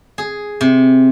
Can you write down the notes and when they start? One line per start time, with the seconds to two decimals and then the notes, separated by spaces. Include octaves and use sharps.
0.18 G#4
0.61 C3